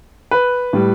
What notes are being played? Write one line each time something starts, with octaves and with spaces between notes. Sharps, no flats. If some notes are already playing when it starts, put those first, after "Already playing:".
B4
A2 G3